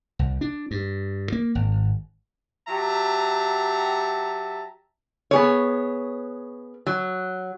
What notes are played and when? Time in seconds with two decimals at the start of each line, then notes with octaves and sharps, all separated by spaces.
0.19 C2
0.41 D4
0.71 G2
1.32 A#3
1.55 G#1
2.68 F#3 G4 E5 A5 A#5
5.31 B3 G#4 C#5
6.86 F#3